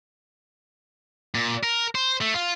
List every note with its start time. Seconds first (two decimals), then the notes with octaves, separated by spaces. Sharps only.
1.35 A#2
1.63 A#4
1.95 C5
2.21 A3
2.34 F4